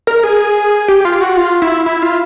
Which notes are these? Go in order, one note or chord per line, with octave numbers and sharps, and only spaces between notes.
A#4
G#4
G4
F4
F#4
F4
E4
E4
F4